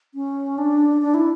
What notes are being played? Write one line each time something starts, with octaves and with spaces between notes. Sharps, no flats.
C#4
D4
D4
E4